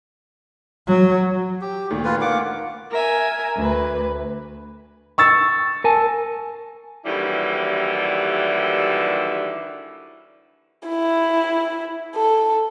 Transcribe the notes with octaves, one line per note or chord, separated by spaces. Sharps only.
F#3
G4
D2 A#2 D#3
F4 B4
A#3 F#5 D6
A#4 E5 G#5
D2 B4
C#6 E6 A6
A#4 G#5 A5
D#2 D3 E3 F#3 G3 E4
E4
A4